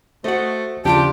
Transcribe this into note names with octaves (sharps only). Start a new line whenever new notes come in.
A3 F#4 C5 D#5 F#5
D#2 C#3 F3 D4 F4 G4 G5 A5